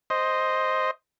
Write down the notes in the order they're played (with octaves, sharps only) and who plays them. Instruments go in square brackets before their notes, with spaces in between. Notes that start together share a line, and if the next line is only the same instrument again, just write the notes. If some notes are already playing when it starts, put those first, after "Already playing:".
[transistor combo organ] C5 D#5